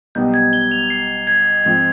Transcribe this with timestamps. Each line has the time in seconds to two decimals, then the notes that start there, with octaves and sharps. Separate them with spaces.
0.15 B1 B2 G3 B3 D#4 G6
0.34 G#6
0.53 G7
0.71 F7
0.90 C7
1.27 G#6
1.64 G#2 F3 C4 F4 G#6